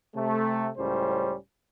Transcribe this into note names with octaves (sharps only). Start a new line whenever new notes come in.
C3 A3
C#2 A2 G3 C#4 C5